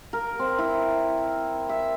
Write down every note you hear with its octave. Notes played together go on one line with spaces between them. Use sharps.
A#4
C4
E4
E5